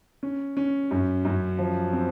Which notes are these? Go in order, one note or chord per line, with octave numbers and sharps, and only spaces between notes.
C#4
C#4
F#2
F#2
F3
C4